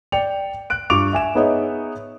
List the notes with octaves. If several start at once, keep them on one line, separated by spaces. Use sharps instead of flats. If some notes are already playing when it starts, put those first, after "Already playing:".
D5 G5 C#7 F7
F#6 D7
G2 F4 C#6 D6 D7 F7
E5 G#5 E7
B3 D#4 G#4 C#5 D#5 E5